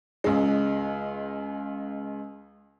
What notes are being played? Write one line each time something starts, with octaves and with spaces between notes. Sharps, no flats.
C#2 G#3